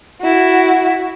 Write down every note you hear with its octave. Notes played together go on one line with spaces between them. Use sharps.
E4 F#4